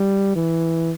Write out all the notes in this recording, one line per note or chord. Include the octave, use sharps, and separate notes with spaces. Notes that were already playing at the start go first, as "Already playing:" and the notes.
Already playing: G3
E3